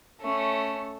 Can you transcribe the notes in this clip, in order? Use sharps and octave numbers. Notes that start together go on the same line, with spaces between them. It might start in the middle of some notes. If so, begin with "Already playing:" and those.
A3 C#4